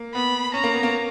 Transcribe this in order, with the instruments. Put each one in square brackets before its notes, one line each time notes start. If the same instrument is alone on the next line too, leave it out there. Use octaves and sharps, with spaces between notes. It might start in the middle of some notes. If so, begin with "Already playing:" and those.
Already playing: [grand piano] A#3
[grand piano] B3 [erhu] B5
[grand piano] C#4 [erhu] A#5
[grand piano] A#3
B3
A#3